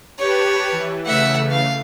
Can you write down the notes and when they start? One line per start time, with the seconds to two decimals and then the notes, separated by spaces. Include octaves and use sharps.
0.19 G4 B4 C#5 A5
0.72 E3
1.06 C#3 E3 A3 E5 F#5
1.51 F5